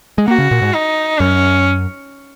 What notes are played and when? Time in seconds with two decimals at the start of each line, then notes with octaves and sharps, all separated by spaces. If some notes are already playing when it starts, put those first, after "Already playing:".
0.18 G#3
0.28 A#3 F#4
0.38 C#3
0.51 A#2
0.62 G#2
0.74 D#4
1.20 F#2 C#4